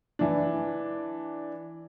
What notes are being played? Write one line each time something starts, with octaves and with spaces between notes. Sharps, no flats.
E3 D4